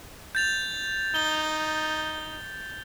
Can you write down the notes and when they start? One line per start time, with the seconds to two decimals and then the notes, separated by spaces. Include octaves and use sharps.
0.35 G6 A6 F7
1.15 D#4 G7